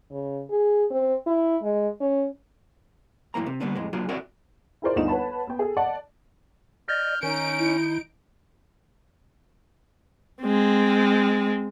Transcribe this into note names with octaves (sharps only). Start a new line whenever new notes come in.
C#3
G#4
C4
E4
G#3
C#4
F#2 A2 E3 A#3 A#5
C3
D3 G3 A#3 B3 D4
F2 A2 G#3
F#3 A#3 D4 F4 G#4
C4 F#4 A#4 C#5 D5 E5
E4 F4 G#4 A#4 C5 D5
G1 D2 D4 D#4 F4 E7
B4 C#5 F#5 A5 B5
B3 G5
G#4 A4
D5 D#5 F#5 A5
D5 D#5 F6 G6
D#3 C#4 D#4 G6 D7
E4
G#3 C4